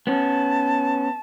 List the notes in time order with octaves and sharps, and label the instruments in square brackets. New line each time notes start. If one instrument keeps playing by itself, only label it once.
[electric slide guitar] B3 C#4 [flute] A5